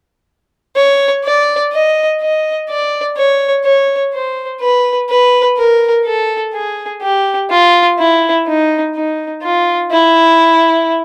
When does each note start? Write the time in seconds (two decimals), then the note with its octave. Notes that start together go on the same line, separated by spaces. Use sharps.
0.76 C#5
1.24 D5
1.72 D#5
2.21 D#5
2.69 D5
3.17 C#5
3.64 C#5
4.13 C5
4.61 B4
5.10 B4
5.57 A#4
6.05 A4
6.54 G#4
7.02 G4
7.50 F4
7.98 E4
8.46 D#4
8.95 D#4
9.42 F4
9.91 E4